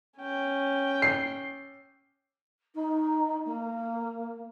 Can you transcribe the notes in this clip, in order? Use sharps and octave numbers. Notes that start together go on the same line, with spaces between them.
C#4 G5
C7
D#4
A#3